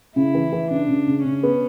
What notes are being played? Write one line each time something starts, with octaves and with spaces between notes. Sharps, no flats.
C#3 E4
E3
E3
C#3 D4
C#3
C#3
C#3 C#4
B3